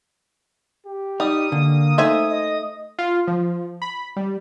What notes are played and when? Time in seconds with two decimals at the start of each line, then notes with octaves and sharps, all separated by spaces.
0.87 G4
1.20 G3 D#4 D#6
1.52 D3 A#3
1.98 A3 D#4 C5 E5 G#5
2.30 D#5
2.99 F4
3.27 F3
3.82 B5
4.16 G3